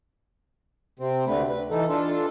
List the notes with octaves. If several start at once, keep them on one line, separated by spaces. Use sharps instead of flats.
C3 C4
D2 D3 A3 B4
B4
E3 D#4 A4
D4 F4 A4